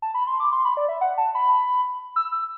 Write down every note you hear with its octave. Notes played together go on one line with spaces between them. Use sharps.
A5
B5
C6
D6
C6
B5
D5
E5
F#5
A5
B5
E6
E6